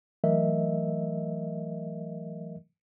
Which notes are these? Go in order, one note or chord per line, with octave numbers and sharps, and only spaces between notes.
E3 F#3 A3 A#4 D#5 E5